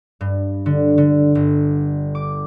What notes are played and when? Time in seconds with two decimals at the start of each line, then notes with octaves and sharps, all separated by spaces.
0.21 G2
0.66 D3
0.98 D3
1.35 G1
2.15 D6